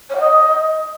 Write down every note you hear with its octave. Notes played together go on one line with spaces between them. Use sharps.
C#5
F#5
D#5